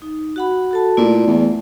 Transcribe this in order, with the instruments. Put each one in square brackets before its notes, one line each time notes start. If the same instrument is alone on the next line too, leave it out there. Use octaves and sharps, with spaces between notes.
[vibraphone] D#4
F#4 F#5 B5
F#4 A4 A5
[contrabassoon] A#2 [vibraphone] A3 E4 D5
[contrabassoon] E2